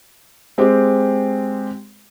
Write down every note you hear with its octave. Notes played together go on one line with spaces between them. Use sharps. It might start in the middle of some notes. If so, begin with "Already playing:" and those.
G#3 C4 G4